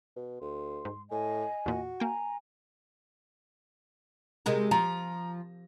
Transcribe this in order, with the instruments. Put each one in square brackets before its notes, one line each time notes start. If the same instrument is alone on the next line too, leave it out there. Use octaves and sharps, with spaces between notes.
[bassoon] B2
[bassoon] D2 [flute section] C6
[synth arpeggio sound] G#2
[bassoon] A2 [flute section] D#5 G#5
[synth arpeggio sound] E2 A#2 [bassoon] F#4
[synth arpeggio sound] A#3 G5 [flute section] G#5 A#5
[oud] C3 G#3 A#4
[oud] F3 [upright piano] A#5